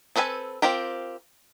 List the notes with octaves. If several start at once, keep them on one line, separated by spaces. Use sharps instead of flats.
C4 A4 B4 E5 G#5
C4 F4 G4 A#4